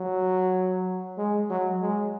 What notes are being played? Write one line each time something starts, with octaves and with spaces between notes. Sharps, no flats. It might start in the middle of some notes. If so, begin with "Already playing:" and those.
Already playing: F#3
G#3
F#3
G#3